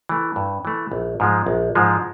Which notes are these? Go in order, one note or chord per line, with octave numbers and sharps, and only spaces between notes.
E3 A3
G2
E3 A3
A#1
G#2 F3 G#3
A#1
G#2 F3 G#3